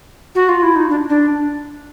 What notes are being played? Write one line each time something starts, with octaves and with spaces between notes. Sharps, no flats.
F#4
F4
E4
D#4
D4
D4